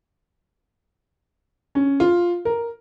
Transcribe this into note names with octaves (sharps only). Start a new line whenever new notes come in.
C#4
F4
A#4